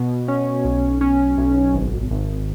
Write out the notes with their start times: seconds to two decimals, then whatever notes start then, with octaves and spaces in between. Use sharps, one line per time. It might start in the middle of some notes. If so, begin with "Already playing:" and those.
Already playing: B2
0.28 C#4
0.65 B1
1.01 C#4
1.38 B1
1.74 G#1
2.11 G#1